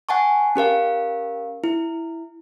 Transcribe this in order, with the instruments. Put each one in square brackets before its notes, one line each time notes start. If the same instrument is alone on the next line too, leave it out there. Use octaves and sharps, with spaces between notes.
[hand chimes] F#5 G#5 A5 C#6
C#4 G4 A#4 F5
E4